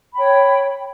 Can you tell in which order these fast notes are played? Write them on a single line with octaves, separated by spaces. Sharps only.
B5 G5 C#5